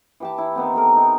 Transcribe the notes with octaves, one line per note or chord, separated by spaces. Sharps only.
E3 G4 A5
E4
D#3 B3 C4
G4 A4 A#4
D#4